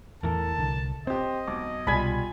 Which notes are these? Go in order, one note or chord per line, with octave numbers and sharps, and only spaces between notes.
E2 A2 E3 A4 A#4 A5
C2 D3
C4 G4 C5 D#5
B1 D6
C2 B2 G3 F4 G#5 B5